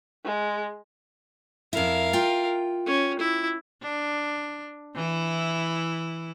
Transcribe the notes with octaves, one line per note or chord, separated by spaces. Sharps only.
G#3
F2 E4 A#4 F5
F4 G5
C#4
E4
D4
E3 E4